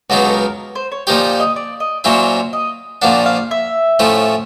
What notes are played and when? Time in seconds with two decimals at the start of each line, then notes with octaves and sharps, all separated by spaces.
0.10 C#2 B2 F#3 B3 D#4 F#4
0.26 A4
0.34 A#4
0.75 C5
0.92 C#5
1.07 A#2 F3 A#3 D#4 G4 C#5
1.40 D#5
1.56 D5
1.80 D#5
2.04 A#2 F#3 A#3 C#4 E4 C5
2.53 D#5
3.02 A#1 A#2 F3 A#3 D4 F#5
3.26 F5
3.51 E5
3.99 A2 F3 A3 C#4 E4